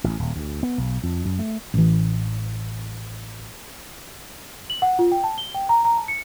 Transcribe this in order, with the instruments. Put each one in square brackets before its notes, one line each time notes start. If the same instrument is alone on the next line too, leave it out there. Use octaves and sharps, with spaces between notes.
[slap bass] A1
D#1
D2
B3
B1
F2
F#2
A3
[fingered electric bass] A1 E3
[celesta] F#7
F#5
F4
G5
A5
G7
G5
A#5
A#5
A5
C#7